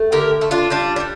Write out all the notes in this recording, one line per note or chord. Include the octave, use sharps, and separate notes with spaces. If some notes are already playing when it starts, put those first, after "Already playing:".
Already playing: A3
D3 G4 A#4
A3
D4 F4
G3 D4 F4
D4
G3